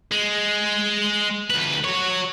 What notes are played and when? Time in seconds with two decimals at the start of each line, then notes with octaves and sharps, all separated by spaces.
0.12 G#3
1.50 D2 B4
1.84 F#4 C#5